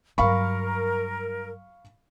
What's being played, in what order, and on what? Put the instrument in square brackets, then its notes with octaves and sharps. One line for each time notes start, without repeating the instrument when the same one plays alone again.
[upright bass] G2 F#3 [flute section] A#4 [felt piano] F5 B5 C#6